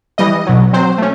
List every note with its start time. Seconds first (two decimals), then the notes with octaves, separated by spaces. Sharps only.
0.18 E3 G3 D#5
0.46 B2 F#3
0.73 F#3 C4 C5
0.98 A3 C#4